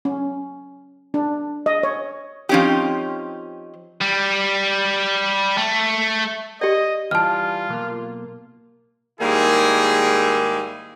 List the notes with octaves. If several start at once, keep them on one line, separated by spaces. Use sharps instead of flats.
C#4
D4
D#5
C#5
F3 C4 C#4 D#4 G4
G3
A3
G4 D5 D#5
E3 G3 F4 A5 F6
B1 A#3
G#2 D#3 G3 A#3 E4 G#4